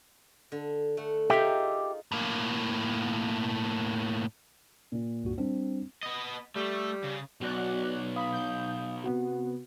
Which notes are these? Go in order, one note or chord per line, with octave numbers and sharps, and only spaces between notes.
D3
A3 F#5
D#4 F4 G4 G#4 E5 G5
A2 A#3
A#2
C#2 G2 F#4
G3 C4 D4
B3 D#5
G3 A3
C#3
B1 F#4 D5 F#6
F5 B5 D#6
G6
C3 B3 F#4 F#5